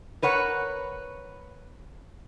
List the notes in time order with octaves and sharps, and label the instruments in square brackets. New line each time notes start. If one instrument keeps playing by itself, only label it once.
[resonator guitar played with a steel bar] A#4 B4 C#5 F#5